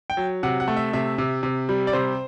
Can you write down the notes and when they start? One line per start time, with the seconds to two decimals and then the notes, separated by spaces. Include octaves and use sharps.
0.10 G5
0.17 F#3
0.43 C3 F#5
0.60 F#5
0.68 A3
0.77 E5
0.93 C3 E5
1.18 C3
1.43 C3
1.69 G3
1.87 D5
1.93 C3 C5